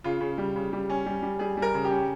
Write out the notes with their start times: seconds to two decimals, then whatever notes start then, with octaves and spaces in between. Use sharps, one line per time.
0.04 C#3 F4
0.21 C#3
0.38 G3
0.56 C#3
0.73 G3
0.90 C#4
1.06 G3
1.22 G3
1.39 G3 G#4
1.57 G3
1.62 A#4
1.74 C#3
1.85 G4
1.91 C#4